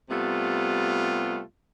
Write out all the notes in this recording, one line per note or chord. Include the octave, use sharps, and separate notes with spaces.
C3 G3 A3 B3 F4